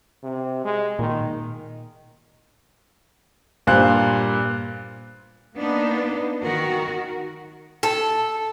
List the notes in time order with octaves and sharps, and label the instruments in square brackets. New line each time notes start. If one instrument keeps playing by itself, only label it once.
[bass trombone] C3
G#3
[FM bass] A#2 [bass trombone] D#3
[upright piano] G2 A#2 C5 F5 F#6
[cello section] A#3 B3 D4 D#4
D#3 F#4 A#4
[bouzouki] A4